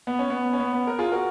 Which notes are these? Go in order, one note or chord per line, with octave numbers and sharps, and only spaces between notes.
B3
C#4
B3
C#4
B3
B3
A#4
F4 G#4
F#4 A#4